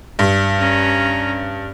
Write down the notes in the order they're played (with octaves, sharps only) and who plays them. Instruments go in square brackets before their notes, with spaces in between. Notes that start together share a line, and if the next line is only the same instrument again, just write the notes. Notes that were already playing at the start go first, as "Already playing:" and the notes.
[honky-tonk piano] G2
[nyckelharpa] C#4 A#5